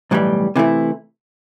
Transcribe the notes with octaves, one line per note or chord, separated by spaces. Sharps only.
B1 A2 E3 G3
C3 E3 A3 E4